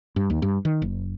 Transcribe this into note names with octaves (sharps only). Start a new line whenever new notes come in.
G2
D#2
G2
D#3
F#1